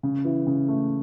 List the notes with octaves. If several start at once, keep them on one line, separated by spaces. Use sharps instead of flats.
C#3
E3
C#3
A3